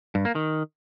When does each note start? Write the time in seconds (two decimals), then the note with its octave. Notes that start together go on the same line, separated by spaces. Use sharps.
0.15 G2
0.25 A#3
0.35 D#3